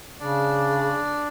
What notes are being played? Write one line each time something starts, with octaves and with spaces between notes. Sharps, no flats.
C#3 D4 D5